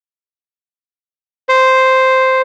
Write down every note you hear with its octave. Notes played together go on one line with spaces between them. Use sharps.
C5